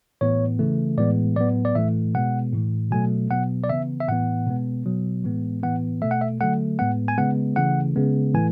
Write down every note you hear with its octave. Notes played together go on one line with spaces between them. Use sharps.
A2 E3 B3 C#5
C#3 E3 A3
A2 E3 G#3 B3 D5
A2 F#3 B3 D5
D5
A2 E3 A3 E5
B2 G#3 B3 F#5
A2 E3 A3
B2 F#3 A3 G#5
B2 F#3 B3 F#5
D5
C#3 E3 B3 E5
E5
A2 E3 B3 F#5
B2 G#3 B3
B2 F#3 B3
A2 E3 G#3 B3
A2 E3 B3 F#5
B2 A3 E5
F#5
E5
D3 F#3 A3 F#5
A2 G#3 B3 F#5
G#5
C#3 G#3 B3 F#5
C#3 E3 A3 F#5
C#3 G#3 B3
A2 E3 A3 G#5